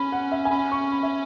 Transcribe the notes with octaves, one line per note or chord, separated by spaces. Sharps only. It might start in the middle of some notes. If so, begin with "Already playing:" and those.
Already playing: C#4 B5
F#5
E5
G#5
C#4 B5
C#6
B5
E5